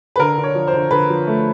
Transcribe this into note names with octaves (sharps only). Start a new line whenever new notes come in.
B4
D3 A#4
D3
C#5
F3
C5
D3
D3 B4
F3
A3